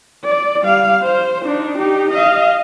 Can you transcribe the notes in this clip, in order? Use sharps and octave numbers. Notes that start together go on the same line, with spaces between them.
D5
G3 F5
C5
D4 D#4
D#4 G4
D#5 F5